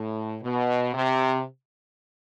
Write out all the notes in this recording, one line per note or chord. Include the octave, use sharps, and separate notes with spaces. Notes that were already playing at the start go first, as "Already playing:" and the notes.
Already playing: A2
B2
C3